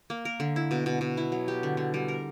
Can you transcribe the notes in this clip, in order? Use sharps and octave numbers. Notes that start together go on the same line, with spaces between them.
A#3
A#4
D3
E4
B2
B2
B2
E4
F#3
G4
D3
D3
G3
A#4